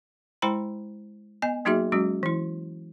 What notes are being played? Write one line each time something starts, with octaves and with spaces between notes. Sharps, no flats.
G#3 E4 C5 G5 A#5 B5
B3 D#5 G#5
F#3 A#3 D#4 F#4 G#4 E5
F#3 G#3 C#4 F#4
E3 E4